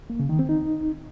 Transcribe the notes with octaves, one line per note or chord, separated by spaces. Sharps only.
A#3
C#3
D#3
C4
D#4